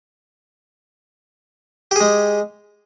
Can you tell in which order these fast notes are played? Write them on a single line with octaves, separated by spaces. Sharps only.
G4 G#4 G#3